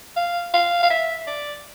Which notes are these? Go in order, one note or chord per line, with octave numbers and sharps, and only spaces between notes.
F5
F5
F5
E5
D5